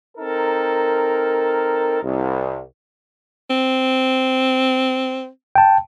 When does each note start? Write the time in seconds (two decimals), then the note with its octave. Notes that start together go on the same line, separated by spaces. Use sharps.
0.18 C4 D#4 A4 A#4
2.03 C2
3.50 C4
5.55 G5 A5